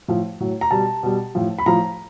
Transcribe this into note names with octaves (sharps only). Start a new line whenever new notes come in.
A2 F3
A2 F#3
A#5
B2 G3 A5
B2 G3
A2 F3
B5
A2 F3 A#5